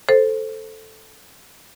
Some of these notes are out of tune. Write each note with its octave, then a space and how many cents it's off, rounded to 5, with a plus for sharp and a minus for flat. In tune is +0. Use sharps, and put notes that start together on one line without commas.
A4 +0 C5 +0